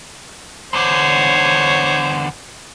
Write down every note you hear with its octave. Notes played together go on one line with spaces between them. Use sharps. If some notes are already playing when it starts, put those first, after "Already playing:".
E2 D3 C5 C#5